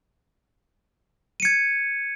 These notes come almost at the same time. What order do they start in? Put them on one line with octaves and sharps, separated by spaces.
D#7 C#7 G#6